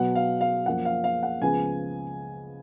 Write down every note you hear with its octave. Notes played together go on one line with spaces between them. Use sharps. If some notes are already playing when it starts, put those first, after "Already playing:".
Already playing: B2 F#3 B3 F#5
F5
F5
F#2 F3 A#3 F#5
F5
F5
F#5
C#2 C#3 F3 B3 G#5